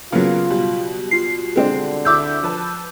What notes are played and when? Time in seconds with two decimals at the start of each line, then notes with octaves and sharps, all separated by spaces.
0.12 C#3 F#3 A#3 B3 F4 F5
0.50 B2 G3
1.11 F4 C7
1.56 D3 G#3 C4 D4
2.05 D2 E4 D6 E6 G6
2.43 F3 B4 A5